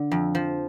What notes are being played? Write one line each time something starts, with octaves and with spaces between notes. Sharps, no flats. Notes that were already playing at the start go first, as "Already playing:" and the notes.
Already playing: D3
F2
F3